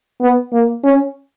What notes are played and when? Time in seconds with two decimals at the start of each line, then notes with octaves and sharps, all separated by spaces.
0.21 B3
0.53 A#3
0.84 C#4